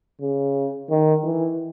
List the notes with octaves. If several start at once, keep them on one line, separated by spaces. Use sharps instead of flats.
C#3
D#3
E3